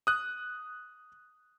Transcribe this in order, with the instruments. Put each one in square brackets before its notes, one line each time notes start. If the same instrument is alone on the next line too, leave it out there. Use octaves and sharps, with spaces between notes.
[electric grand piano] D#6 F#6